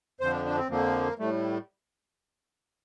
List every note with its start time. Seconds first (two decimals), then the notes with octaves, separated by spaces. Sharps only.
0.20 F2 D3 F3 C5
0.32 D4
0.45 D4
0.57 C4
0.69 F2 D3 F3 A#3
1.19 A2 G3 A3